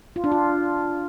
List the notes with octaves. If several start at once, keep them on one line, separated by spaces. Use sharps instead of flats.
F4
D4
F4